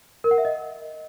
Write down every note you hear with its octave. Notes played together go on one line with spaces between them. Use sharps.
A#4
F#5
E5
D#5